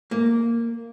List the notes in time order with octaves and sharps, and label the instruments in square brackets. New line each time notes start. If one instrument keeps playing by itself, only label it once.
[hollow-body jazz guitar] A#3